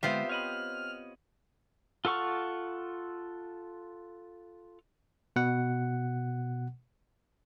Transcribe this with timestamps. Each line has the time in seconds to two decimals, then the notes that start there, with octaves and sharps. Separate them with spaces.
0.03 D3 G#3 B3 C4 F4 G4 C5 E5
0.29 C#5 D#5 B5 F6
2.05 F4 A4 F#5 C#6 F6
5.36 B2 F#5